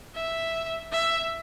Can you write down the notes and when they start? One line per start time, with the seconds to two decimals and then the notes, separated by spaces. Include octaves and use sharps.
0.15 E5
0.92 E5